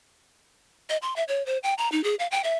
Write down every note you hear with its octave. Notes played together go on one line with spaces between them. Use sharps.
D#5
C6
E5
C#5
C5
G5
A#5
D#4
G#4
F5
G5
E5